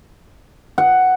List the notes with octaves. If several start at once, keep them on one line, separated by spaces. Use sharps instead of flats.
F#5